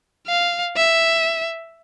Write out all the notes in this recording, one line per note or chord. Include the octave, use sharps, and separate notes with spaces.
F5
E5